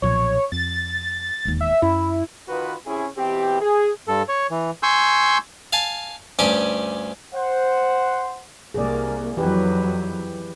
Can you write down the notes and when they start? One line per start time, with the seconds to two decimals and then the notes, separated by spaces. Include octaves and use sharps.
0.02 B1 A#2 F3 C#5
0.52 F2 A6
1.45 E1 D#2
1.61 E5
1.82 F#2 E4
2.49 D#3 F4 F#4 B4
2.86 C3 C#4 E4 G#4
3.18 B2 E3 C4 G4
3.61 G#4
4.08 G2 A4
4.29 C#5
4.51 E3
4.83 G#5 C6 C#6 E6 G6
5.73 F5 G#5 A5
6.39 D2 G2 C#4 G4 G#5 D6
7.35 C5 F#5
8.74 C2 A#3 G#4 D5
9.37 F2 E3 F#3 G4 B4